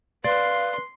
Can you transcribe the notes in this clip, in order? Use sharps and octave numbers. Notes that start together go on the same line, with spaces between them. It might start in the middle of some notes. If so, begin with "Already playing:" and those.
B4 D5 F5 C6